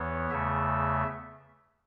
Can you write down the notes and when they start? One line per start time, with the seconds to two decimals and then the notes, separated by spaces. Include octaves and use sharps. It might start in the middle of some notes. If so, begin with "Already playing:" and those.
Already playing: E2 E3 B3 C#5
0.31 E2 C#3 A3 E5